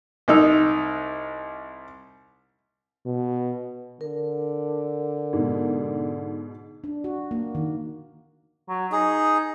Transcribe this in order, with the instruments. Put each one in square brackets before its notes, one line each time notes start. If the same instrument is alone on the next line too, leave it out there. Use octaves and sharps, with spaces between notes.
[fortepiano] C2 D#4 E6
[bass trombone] B2
[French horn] D3 [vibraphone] A#4
[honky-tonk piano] G#2 B2
[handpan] D4
F#4
A#3
D#3
[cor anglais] F#3
[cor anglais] D#4 [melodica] G#4